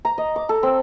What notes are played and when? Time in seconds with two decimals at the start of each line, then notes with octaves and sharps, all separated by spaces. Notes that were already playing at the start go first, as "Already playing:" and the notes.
0.05 A#5
0.18 D#5
0.36 D6
0.49 A4
0.63 C4